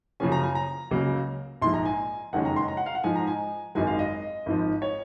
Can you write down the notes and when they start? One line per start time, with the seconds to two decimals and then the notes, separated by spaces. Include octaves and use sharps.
0.20 F#2 C#3 F3 A#3 C#4 G#5
0.32 A#5
0.43 G#5
0.55 A#5
0.91 C#2 C#3 F#3 A#3
1.62 A#1 G#2 F3 G#3 C6
1.74 A#5
1.85 G#5
2.33 F#1 F2 D#3 G#3 C#4 F#5
2.45 A#5
2.56 C6
2.68 A#5
2.77 F#5
2.86 F5
2.95 F#5
3.04 G#2 F3 G#3 G#5
3.16 A#5
3.27 G#5
3.75 G#1 F#2 D#3 G#3 G#5
3.87 F5
3.99 D#5
4.46 G#1 G#2 F3
4.82 C#5